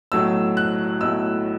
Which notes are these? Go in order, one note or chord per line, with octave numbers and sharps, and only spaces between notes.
B1 A2 F#3 A3 E6
F#6
B1 A2 F#3 A3 E6